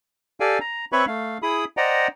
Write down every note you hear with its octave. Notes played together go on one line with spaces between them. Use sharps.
G4 A4 D5 F5 G5 G#5
A#5
C4 B4 C#5 E5 B5 C#6
A3 F5
E4 G#4 B5 D#6
C5 D5 D#5 F#5 G5 A#5